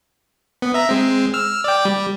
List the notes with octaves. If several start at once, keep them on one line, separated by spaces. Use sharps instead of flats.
B3
E5 A#5
G#3 C4
E6 F6
D5 G5
G3